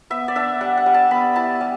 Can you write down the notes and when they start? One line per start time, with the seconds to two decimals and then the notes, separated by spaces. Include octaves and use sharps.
0.10 B3 E5
0.28 D5
0.36 D4 E5
0.61 G3 F#5
0.77 F#5
0.86 G3
0.94 A5
1.11 B3 B5
1.36 E4 A5
1.61 G3